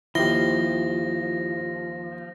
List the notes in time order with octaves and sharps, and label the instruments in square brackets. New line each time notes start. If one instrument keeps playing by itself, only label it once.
[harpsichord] D#2 C6 [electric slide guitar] F3 [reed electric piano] E4 G4 [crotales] A#6